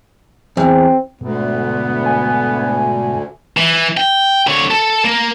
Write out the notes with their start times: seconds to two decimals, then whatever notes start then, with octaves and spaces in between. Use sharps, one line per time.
0.57 E2 C4
1.21 D2 G#2 B2 B3
2.06 G#5
3.57 E3
3.97 G5
4.47 D3 C#5
4.71 A4
5.05 A#3